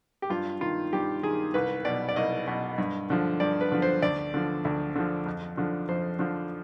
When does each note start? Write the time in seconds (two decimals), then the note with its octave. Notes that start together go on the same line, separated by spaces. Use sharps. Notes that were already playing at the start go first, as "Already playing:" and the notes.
0.22 G4
0.30 G2 F4
0.61 D#3 F4
0.93 G2 G4
1.23 D#3 G#4
1.54 C2 B4
1.85 B2 D5
2.09 D5
2.16 C2 D#5
2.47 B2
2.78 G2
3.10 D3 F3
3.40 G2 D5
3.61 B4
3.72 D3 F3
3.82 C5
4.02 D2 D5
4.34 D3 F3
4.65 D2
4.96 D3 F3
5.26 F2
5.57 D3 F3
5.88 F2 C5
6.19 D3 F3